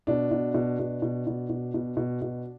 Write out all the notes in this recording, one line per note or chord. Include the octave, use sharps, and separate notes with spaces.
B2 D4
B2
B2
B2
B2
B2
B2
B2
B2
B2